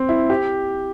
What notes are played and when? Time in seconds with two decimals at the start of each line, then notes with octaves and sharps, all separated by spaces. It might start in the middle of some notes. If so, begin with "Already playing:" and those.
Already playing: C4
0.09 E4
0.30 G4